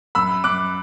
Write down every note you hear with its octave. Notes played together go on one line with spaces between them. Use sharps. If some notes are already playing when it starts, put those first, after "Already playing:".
F#2 B5 E6
F#2 D6 F#6